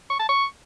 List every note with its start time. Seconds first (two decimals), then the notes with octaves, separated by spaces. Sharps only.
0.10 C#6
0.19 A5
0.29 C#6